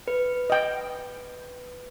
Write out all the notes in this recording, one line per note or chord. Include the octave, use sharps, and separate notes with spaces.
B4
D#5 G5